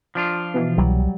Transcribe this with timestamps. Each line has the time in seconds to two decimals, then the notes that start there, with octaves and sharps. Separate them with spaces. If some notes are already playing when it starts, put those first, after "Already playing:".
0.15 F3 D4 F4
0.54 B2 E3
0.78 C2 F#3 G3